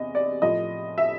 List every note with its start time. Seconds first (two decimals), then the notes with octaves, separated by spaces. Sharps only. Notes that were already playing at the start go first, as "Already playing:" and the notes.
Already playing: E2 C3 D#5
0.15 D5
0.42 A2 F3 D#5
0.98 E5